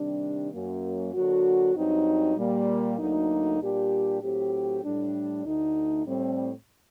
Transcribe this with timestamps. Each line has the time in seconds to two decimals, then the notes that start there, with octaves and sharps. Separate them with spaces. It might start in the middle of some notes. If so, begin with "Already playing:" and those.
Already playing: C3 D#3 G3 D4
0.51 F#2 F#3 A#3
1.13 D3 F#3 A#3 F#4
1.74 G2 F#3 C4 D#4
2.36 A#2 G3 A#3
2.98 D2 D3 F#3 A#3 D#4
3.59 A#2 G3 D4 G4
4.21 A2 F#3 C4 G4
4.83 A2 G3 D4
5.44 D2 D3 A3 D#4
6.06 A2 G3 C4